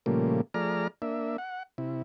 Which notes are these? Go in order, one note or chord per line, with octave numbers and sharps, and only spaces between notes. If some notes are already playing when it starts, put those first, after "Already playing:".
A#2 C#3 F3 G3 A3 A#3
F3 A3 G#4 D5 A#5 F6
A#3 D4 E5
F#5
C3 E4